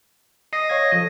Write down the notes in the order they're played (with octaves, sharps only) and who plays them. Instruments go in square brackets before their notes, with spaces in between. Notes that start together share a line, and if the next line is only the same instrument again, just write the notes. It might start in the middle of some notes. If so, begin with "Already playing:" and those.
[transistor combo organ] D#5 [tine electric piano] C7
[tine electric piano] C#5 F5 G#6
F3 A4